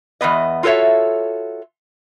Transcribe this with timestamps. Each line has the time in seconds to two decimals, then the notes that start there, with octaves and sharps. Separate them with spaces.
0.21 E2 G#2 B3 D#5
0.63 F4 F#4 A4 C5 C#5 E5